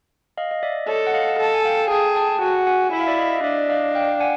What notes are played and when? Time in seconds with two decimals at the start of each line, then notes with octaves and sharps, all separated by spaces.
0.37 D#5 F5
0.51 D#5
0.63 D5 E5
0.88 A4 C#5 D#5
1.07 F#5
1.14 D#5 F5
1.39 A4 A5
1.54 G#5
1.65 F5 G5
1.91 G#4 G5 A5
2.16 G5 A5
2.42 F#4 F#5 G#5
2.67 F#5 G#5
2.93 E4 E5
3.00 F5
3.07 D5 E5
3.19 D#5 F5
3.39 D#5
3.44 D4 D5 E5
3.70 D#5 F5
3.95 F5 G5
4.20 F#5 G#5